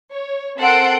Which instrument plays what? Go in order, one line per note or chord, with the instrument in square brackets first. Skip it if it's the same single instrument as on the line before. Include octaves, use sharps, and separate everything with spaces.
[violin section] C#5
C4 A4 A#4 F#5 C6 D7